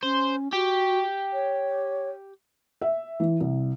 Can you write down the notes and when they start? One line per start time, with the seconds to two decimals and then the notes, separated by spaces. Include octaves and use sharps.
0.03 C#4 C5
0.53 F#4 G4
1.33 C#5
2.82 E5
3.20 E3
3.40 C2